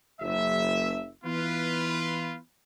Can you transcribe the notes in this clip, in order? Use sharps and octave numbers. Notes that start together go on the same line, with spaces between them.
F#1 E5
E3 B3 F4 B4